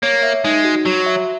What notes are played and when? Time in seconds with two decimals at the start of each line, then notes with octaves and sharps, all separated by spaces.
0.03 A#3 C#5
0.23 E5
0.44 G#3 D#4
0.65 F#4
0.86 F#3 F#4
1.06 E5